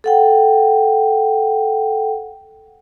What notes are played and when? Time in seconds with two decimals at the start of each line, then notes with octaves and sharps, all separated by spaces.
0.04 A4 F#5 G5